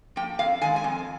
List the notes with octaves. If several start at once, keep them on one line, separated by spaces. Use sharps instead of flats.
F3 A#3 G5
F2 F5
D#3 G#3 G#5
G#5
F2